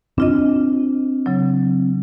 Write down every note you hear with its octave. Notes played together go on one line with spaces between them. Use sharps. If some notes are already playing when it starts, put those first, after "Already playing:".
C4 D4 F4 D#5
C#3 F#3